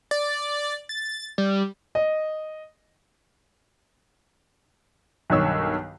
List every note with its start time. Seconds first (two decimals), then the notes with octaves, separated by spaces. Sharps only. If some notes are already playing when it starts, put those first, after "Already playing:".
0.11 D5
0.89 A6
1.38 G3
1.95 D#5
5.30 B1 G2 D#3 C#5 E6